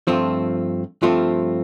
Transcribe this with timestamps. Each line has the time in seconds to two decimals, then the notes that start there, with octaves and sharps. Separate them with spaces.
0.07 G2 F3 A3 C4 F4
1.02 G2 F3 A3 C4 F4